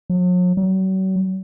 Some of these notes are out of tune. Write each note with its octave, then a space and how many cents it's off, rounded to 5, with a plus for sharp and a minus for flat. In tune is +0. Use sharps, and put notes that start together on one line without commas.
F#3 -45
F#3 +40